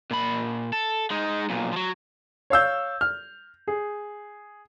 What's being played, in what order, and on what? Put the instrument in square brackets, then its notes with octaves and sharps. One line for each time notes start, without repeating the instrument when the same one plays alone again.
[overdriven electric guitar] A#2 B5
A4
G#3 D#4
B1 A#2
F3 F#3
[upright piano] C#5 F5 E6 G6
F6
G#4